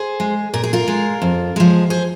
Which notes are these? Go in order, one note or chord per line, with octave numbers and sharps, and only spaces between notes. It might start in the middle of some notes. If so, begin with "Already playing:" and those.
Already playing: G#4 C5
G#3
A#2 A#4
G#4
F4 A#4
G#3
F2
F3 G#3
G#4 C5